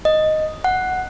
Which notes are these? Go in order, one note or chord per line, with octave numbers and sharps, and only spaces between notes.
D#5
F#5